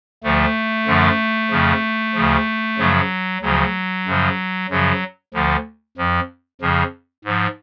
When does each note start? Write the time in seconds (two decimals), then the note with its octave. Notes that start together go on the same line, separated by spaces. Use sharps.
0.23 D2 D3 F3 A3
0.87 F#2 D3 F3
1.50 F2 C#3 F3
2.15 D2 C#3 F3
2.78 F#2 C#3 F3 F#3
3.42 D2 C#3 F3 F#3
4.06 F#2 C#3 F3
4.70 F#2 C#3 F3 F#3
5.34 D2 D3 F3
5.97 F2 F3
6.61 F2 C#3 F3
7.25 G#2 F3